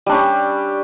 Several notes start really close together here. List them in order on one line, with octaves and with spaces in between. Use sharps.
G3 D4 C#4 G4